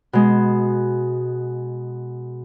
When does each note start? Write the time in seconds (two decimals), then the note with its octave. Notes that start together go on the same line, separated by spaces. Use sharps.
0.13 B2 G#3